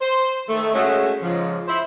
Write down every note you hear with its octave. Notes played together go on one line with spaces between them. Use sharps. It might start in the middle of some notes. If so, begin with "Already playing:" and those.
C5
D#3 A3
G#3 A3 C#4 F#4 G#4
G#2 C#3 F3
E4 C5